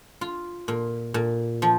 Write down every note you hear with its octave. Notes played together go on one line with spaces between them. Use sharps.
F4
A#2
A#2
F3